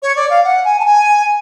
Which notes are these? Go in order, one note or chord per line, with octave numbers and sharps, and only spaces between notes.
C#5
D5
F5
F#5
G#5
A5
G#5